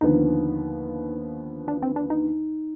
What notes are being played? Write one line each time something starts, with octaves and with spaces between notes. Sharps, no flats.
D#2 D3 F3 B3 D#4
D4
C4
D4
D#4